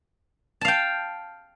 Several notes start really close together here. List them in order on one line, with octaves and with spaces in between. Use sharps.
A5 F5 G5